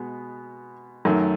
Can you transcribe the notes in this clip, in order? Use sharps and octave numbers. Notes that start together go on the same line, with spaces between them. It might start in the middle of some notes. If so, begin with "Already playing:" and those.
Already playing: B2 G#3 B3
F#2 D#3 A3